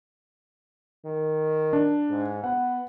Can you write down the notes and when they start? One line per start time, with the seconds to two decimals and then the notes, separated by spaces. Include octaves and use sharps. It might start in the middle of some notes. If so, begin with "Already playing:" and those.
1.06 D#3
1.73 D4
2.10 G#2
2.44 B3 F#5